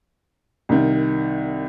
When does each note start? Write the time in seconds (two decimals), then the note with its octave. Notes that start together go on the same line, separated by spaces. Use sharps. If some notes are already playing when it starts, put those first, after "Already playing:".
0.69 C2 D#3